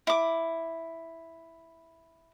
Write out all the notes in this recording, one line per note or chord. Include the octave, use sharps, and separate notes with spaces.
E4 D6